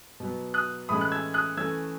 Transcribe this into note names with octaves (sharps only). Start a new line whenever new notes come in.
B2 F#3 B3
D#6 F#6
A2 E3 G#3 C#4 B5 D#6
F#6
E6 G#6
D#6 F#6
E3 A3 C#4 E6 G#6